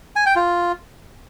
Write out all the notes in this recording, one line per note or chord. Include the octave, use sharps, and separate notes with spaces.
G#5
G5
F4